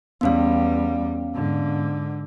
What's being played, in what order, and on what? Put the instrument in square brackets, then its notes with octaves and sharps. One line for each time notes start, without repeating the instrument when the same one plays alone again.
[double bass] E2 G3 [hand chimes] B3 C#4 F5
[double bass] G#2 D3